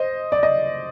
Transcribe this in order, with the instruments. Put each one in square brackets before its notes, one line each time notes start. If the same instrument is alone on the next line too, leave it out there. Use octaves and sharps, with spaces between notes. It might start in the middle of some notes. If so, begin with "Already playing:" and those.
Already playing: [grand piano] C5 D#5
D5
D#5